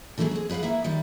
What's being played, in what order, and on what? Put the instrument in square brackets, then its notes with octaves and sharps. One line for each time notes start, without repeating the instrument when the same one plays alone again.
[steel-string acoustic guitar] D3 E3 F#3 G#3 A#3 G#4
C4 G#4
G#4 B4 C#5 F5 F#5
A#3 E4 E5 F#5
D#3 G3 B4